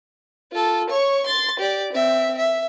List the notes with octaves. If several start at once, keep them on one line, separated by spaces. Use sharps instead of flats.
F4 A4
C#5 C#6
C6 A6
G4 D5
C4 E5
E5